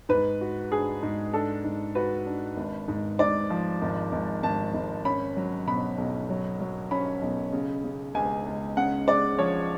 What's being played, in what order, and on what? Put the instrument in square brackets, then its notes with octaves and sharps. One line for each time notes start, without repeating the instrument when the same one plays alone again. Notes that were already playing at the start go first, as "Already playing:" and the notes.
[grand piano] G#2 [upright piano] B4
[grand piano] F#4
[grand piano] D4 [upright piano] G#4
[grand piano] G#2
[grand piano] D4 [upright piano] A4
[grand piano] G#2
[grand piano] F#4 [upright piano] B4
[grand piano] D4
G#1
G#2
[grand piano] G#2 [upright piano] D5
[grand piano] F3
G#1
G#1
[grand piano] G#1 [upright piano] A5
[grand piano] G#1
[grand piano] C#4 [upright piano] B5
[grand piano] F#3
[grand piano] B2 [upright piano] B5
[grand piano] B1
F#3
F#3
[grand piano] C#4 [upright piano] B5
[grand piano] B1
C#3
C#3
[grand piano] C#2 [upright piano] G#5
[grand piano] C#2
[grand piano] C#3 [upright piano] F#5
[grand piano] G#3 [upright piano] D5
[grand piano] F3 [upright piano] C#5